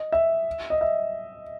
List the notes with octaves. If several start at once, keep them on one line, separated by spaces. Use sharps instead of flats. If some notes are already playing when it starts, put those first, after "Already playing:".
Already playing: D#5
E5
D#5
E5